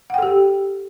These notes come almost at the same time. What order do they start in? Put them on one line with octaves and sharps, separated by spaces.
F#5 G5 A4 G4